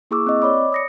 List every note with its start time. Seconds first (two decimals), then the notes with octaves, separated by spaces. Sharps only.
0.11 A#3 E4 G#4 C#6 D6 E6
0.27 C4 D#5
0.42 C#5 D5 B5 D6
0.72 D#6 A#6 C#7